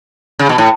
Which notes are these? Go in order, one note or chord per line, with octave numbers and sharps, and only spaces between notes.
C#3
B2
A2